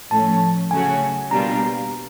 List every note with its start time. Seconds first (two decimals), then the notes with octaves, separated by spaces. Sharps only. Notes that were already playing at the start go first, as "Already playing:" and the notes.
0.11 A2 F3 A3 C#4 A5
0.70 C#3 F#3 A3 C#4 F#4 G#5
1.31 B2 G3 A#3 D4 F4 A#5